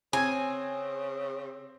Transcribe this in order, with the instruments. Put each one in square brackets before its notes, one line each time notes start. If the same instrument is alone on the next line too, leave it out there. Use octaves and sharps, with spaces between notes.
[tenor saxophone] C#3 [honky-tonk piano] C4 [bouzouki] G#5